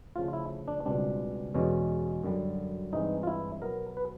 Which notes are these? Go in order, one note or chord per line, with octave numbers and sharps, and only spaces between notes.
D2 C#3 F3 A3 F4
E4
D4
C#2 B2 G3 C4 D4
E2 B2 G#3 C#4
F#2 D3 G3
G2 E3 G#3 C4 D#4
F4
E4
B2 F#3 B3 A#4
B4